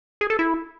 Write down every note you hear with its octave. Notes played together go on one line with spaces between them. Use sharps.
G#4
A4
E4